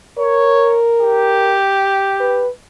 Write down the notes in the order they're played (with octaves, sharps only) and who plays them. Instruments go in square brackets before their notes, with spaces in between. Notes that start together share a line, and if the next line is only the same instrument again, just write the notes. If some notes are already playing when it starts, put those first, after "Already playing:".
[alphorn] A#4 [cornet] C#5
[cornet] G4
[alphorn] B4